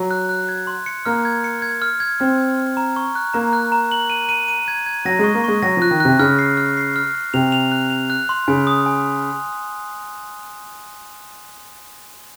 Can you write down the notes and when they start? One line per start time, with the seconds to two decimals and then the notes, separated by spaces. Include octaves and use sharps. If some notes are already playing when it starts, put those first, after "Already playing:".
Already playing: F#3
0.11 F#6
0.29 F#6
0.49 G#6
0.67 C6
0.86 C#7
1.06 A#3 F6
1.25 G#6
1.44 C#7
1.62 G#6
1.82 F6
2.00 G#6
2.20 C4 F6
2.38 G#6
2.58 F6
2.77 A#5
2.96 C#6
3.15 F#6
3.34 A#3 A#5
3.53 F#6
3.72 A#5
3.92 F#7
4.10 D#7
4.29 D#7
4.48 D#7
4.68 G#6
4.86 G#6
5.05 F#3 A#6
5.19 G#3 C#6
5.35 A#3
5.44 G#3 C#6
5.62 F#3 A#6
5.77 F3 F#6
5.91 D#3
6.00 C3 F#6
6.19 C#3 F6
6.39 C7
6.57 F6
6.77 C7
6.96 F6
7.15 F6
7.34 C3 F7
7.52 F7
7.72 F#6
7.90 F7
8.10 F#6
8.29 C6
8.48 C#3 G#5
8.67 D#6
8.86 G#5